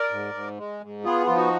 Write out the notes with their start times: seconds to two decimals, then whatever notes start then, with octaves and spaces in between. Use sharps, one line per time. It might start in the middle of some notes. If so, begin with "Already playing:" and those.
Already playing: A#4 D5
0.11 G#2
0.34 G#2
0.58 G#3
0.81 G#2
1.05 B3 F4 G#4
1.27 F3 F4
1.36 D#4 F#4